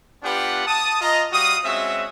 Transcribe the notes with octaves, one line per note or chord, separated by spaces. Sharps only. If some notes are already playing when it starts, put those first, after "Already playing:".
B3 D4 F4 G4 B4 F#5
A5 D#6
F4 D#5 A#5
G3 F#4 F5 D#6
G#3 C4 C#4 F#4 E5